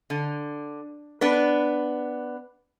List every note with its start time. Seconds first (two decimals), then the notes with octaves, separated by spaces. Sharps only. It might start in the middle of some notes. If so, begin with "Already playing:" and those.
0.10 D3
1.21 B3 D4 B4